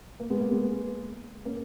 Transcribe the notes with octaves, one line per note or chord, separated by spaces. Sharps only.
A#3
G#3 B3
A#3
G#3 B3
A#3 C#4